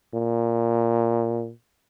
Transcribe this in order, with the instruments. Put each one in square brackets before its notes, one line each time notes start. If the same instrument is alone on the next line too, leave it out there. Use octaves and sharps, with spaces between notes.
[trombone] A#2